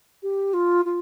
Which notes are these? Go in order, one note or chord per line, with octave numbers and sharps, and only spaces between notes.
G4
F4
F4